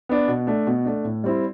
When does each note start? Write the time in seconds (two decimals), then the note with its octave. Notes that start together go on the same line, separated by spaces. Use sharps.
0.09 B3 D4
0.28 B2
0.47 A3 D4
0.67 B2
0.85 A3 D4
1.04 A2
1.24 G3 C4 E4